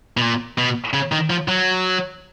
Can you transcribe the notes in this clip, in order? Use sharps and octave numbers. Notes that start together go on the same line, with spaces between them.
B2
A#2
B2
C#3
D#3
F3
F#3